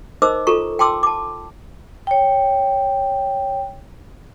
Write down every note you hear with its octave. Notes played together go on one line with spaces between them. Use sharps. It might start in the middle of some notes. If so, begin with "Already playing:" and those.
D#4 A#4 C5 D#5 D6 E6
F4 A4 A#5 C#6
G5 A5 C6 D6 E6
A5 D6
C#5 G5